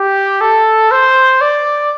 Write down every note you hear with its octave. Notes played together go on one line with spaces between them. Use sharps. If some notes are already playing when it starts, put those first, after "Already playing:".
Already playing: G4
A4
C5
D5